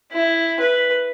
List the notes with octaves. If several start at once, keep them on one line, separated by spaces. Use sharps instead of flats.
E4
B4